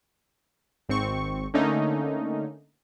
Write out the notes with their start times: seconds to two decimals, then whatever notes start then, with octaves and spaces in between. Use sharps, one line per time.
0.89 G#1 C4 C#6
1.54 D3 A3 A#3 C#4 D#4